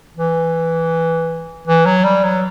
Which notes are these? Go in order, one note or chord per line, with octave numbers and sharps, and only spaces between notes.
E3
E3
F#3
G3
F#3